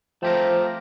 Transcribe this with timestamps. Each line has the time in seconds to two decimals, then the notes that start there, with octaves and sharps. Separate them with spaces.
0.23 F3 A3 C4 G4 A#4